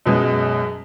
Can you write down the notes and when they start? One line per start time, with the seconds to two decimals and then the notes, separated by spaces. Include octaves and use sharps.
0.06 F#2 B2 G#3